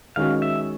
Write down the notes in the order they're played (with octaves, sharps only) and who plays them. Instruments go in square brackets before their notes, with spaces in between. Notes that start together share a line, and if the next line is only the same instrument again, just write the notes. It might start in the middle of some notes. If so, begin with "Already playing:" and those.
[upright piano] D#3 G#3 C#4 F#4 [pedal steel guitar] F5
[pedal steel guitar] E5